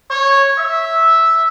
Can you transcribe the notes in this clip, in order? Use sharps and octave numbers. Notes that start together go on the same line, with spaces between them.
C#5
E5